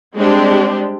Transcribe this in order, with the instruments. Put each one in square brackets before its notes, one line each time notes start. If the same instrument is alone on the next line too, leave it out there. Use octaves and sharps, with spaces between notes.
[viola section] G3 G#3 C4 D4 G4 C5